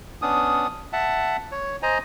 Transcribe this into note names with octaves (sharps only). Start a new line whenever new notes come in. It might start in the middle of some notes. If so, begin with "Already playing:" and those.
B3 C#4 D4 D#6
E5 F#5 A5
C#5
C5 D#5 G#5 A#5